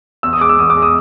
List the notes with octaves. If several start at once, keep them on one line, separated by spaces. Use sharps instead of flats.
E2 E6
D#6
G#3 D6
E6
E2 D#6
D6
G#3
D#6